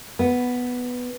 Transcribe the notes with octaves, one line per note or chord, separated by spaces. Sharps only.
B3